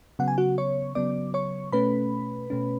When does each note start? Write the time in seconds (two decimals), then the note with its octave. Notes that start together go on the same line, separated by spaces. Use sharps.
0.19 C#3 F#3 B3 F#5
0.28 G#5
0.38 F#4 F#5
0.58 C#5 C#6
0.95 C#3 F#3 B3 D5 D6
1.34 C#5 C#6
1.72 B2 A3 C#4 B4 B5
2.50 B2 A3 C#4